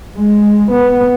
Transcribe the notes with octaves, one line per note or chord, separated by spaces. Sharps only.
G#3
B3